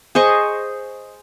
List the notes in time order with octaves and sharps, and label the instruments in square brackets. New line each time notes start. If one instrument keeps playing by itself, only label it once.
[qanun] G#4 C5 D#5 C#6